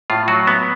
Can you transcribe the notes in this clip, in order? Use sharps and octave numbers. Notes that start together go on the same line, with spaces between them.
A2 F4
F#3 F#4
B3